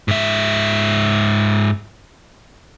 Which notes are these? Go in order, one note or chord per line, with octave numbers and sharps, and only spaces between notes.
G#2 E5